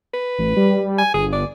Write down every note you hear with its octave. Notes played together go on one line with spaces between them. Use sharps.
B4
A1
G3
G#5
G1 G#4
D5